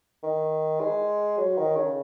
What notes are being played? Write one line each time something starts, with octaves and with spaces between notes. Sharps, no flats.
D#3
G#3
F#3
D#3
C#3